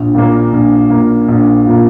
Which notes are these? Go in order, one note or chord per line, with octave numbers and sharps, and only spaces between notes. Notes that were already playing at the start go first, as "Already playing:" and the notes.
Already playing: A#1
A#2 A#3
A#1
A#2 A#3
A#1
A#2 A#3